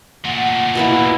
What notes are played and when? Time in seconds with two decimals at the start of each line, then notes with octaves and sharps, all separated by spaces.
0.25 A#2 A3 F#5
0.75 B2 A#3 E4